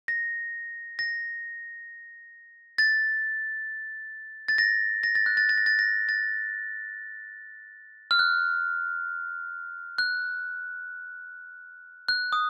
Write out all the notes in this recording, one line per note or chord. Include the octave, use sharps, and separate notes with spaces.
A#6
A#6
A6
A6
A#6
A#6
A6
F#6
A6
A6
A#6
A6
A#6
A6
F6
F#6
F#6
F#6
D#6